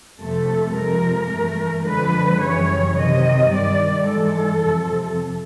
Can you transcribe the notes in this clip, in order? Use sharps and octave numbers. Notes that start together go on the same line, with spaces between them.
F2 C3 F3 A3 A4
C3 F3 G#3 A#4
G2 E3 A3
F2 D3 F3 G#3 B4
F#2 C#3 E3 G3 C#5
C3 D#3 F#3 D#5
G2 D#3 G3 D5
G#2 E3 G#3 A4
F2 C3 F3